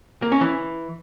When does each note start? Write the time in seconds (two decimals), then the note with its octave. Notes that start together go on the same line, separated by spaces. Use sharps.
0.22 A#3
0.32 C#4
0.41 E3